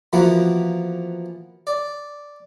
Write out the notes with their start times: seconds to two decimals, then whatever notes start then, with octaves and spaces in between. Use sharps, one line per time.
0.13 E3 F3 A#3 B3 F#4
1.67 D5